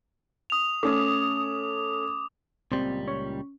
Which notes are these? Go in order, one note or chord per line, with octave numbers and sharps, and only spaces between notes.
D#6 F7
A3 C#4 D6 D#6
C#2 A#2 G3 C4
C#4